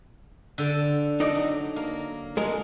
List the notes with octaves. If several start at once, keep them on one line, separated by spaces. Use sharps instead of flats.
D3 A4 G5
D#4 A4 D5
F#3
A#3
G#3 A4 A#4